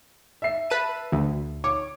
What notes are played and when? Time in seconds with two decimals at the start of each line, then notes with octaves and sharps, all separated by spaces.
0.42 E5 C7
0.70 B4 A5 D#7
1.12 D2
1.64 C#5 D6